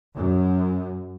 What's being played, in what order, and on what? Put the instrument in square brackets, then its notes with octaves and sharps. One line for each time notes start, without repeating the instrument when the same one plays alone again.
[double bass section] F#2